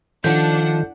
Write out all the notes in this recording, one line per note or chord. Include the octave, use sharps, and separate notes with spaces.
D#3 F3 D4 A4 F#5 G6